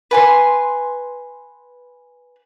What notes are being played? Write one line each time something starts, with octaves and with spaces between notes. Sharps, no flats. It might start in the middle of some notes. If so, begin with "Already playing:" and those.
B4 G#5 C6